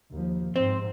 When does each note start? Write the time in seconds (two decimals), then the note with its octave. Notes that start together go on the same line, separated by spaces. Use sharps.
0.11 D#2 F3
0.56 G#2 C4 C5